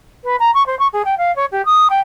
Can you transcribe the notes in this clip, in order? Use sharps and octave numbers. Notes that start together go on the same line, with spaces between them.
B4
A#5
C#6
C5
C#6
G#4
G5
F5
C#5
G4
D#6
G5